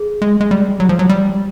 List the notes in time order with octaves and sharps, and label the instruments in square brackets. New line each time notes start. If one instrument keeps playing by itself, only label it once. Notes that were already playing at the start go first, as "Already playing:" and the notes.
Already playing: [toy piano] G#4
[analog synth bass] G#3
G#3
G3
F#3
F3
F#3
G3